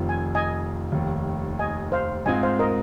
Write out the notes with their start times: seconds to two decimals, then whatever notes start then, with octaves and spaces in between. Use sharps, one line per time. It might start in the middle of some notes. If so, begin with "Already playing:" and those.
Already playing: F1 F2 D#3 C4 F4
0.09 G#5
0.35 D#5 G#5
0.92 F1 D#2 D#3
1.59 D#5 G#5
1.92 C5 F5
2.26 G#2 G#3 C4 F4 D#5 G#5
2.43 C5 F5
2.59 A#4 D#5